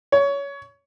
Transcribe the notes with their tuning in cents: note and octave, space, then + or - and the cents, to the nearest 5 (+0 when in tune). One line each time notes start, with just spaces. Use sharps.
C#5 +20